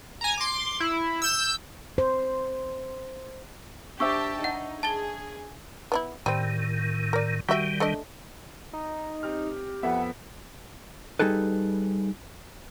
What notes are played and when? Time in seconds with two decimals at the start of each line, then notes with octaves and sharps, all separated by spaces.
0.21 G#5 A#5
0.38 C6 D6
0.80 E4
1.22 E6 G6 E7
1.98 C5
4.00 D4 G4 C5 E5 G5 A5 C#6 E6
4.44 D#4 F#5
4.83 G#4 A5 A6 G7
5.92 B3 D4 E4
6.26 A2 D#3 G3 C4
7.13 A#4 D5
7.49 D#3 G3 F#4 G4 E5
7.80 A3 D4 D#5
8.73 D#4
9.23 C4 G4 F6
9.83 F2 B3 A4 E5 F#5
11.19 G3 D#4 G#4 A4 B4